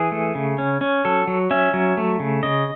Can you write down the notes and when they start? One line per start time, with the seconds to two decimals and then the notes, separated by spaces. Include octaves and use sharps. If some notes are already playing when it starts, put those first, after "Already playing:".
Already playing: E3 G#4
0.12 A3
0.35 C#3
0.58 C#4
0.81 C#4
1.05 F#3 A4
1.27 F#3
1.51 C#4 E5
1.74 F#3
1.97 A3
2.20 C#3
2.43 C#3 D#5